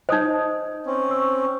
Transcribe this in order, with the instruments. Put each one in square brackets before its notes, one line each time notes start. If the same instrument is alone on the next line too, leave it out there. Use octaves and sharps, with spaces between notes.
[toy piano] D#4 C5 [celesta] D#5 D#6 G6
[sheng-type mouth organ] C4 C#4
[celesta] C#6 E6